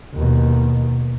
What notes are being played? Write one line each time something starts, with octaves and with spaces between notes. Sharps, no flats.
D#2 B2